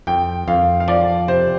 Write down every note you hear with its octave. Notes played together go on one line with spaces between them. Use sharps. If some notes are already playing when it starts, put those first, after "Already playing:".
F2 G5
F2 F5
F5
F3 D5
C3 C5